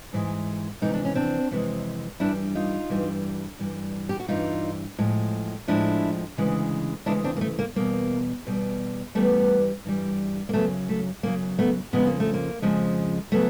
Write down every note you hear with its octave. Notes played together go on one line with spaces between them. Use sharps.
G#2 E3 G#3
F2 C3 E3 G#3 D#4
D4
C#4
C4 D4
F2 C3 E3 G#3
G2 E3 G3 D4 E4
D#4 F4
G2 E3 G3
G2 E3 G3
G4
F#4
G2 E3 G3 D#4 F4
A2 F3 G#3
A2 F3 G#3 D4 E4
D2 C#3 E3 G#3
D2 C#3 E3 G#3 D4 E4
C4 D4
A#3
A3
A#3
E2 B2 G3 A#3
E2 B2 G3
G2 E3 G3 A3 B3
G2 E3 G3
A#3
F#2 C#3 F#3 A3 B3
A3
F#2 C#3 F#3 A#3
A3 B3
F2 C#3 F3 G#3 B3
A#3
A3
A#3
F2 C#3 F3 G#3
C#3 F#3 A3 B3